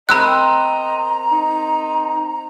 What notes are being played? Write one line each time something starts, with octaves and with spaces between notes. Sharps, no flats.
C4 A#4 D#5 A#5 B5 E6 F#6
D#4